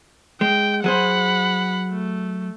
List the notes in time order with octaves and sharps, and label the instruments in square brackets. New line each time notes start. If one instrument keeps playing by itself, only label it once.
[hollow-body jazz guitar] G#3 [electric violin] G5
[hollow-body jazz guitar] F#3 G#4 C5 [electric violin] F#5 B5
[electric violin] A3